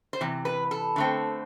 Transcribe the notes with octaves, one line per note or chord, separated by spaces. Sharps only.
C5
C3 E3
B4
A4
D3 A3 C4